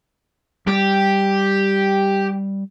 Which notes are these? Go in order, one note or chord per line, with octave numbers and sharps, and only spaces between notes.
G3 G4